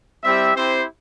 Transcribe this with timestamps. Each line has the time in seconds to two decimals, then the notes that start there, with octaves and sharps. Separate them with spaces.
0.23 G3 C4 E4 G4 E5
0.55 C4 E4 G4 C5